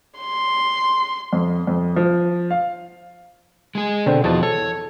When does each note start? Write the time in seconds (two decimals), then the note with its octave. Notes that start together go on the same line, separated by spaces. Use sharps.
0.20 C6
1.33 F2
1.67 F2
1.96 F3
2.50 F5
3.75 G#3 G#4
4.06 B2 D3 C4 C5
4.24 E2 B2 F3 A5
4.43 A4 C#5